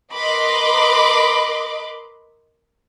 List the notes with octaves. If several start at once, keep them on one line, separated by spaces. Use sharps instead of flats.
A#4 B4 D#5 B5 C6 D6